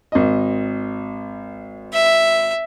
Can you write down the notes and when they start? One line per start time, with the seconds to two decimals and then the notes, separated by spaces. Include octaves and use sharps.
0.12 G#1 D#5
1.93 E5